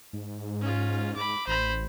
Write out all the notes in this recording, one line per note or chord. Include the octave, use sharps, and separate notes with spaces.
G#2
C#4 F4
G#2 B5 D6
A1 C5 B5